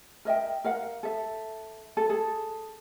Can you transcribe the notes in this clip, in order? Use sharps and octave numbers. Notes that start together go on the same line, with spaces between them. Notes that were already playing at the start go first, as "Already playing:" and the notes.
A#4 D#5 E5 G5
A#4 F5 F#5
A4 E5
A4
G#4 A4